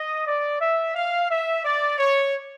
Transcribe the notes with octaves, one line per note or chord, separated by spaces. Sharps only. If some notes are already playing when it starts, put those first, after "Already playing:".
Already playing: D#5
D5
E5
F5
E5
D5
C#5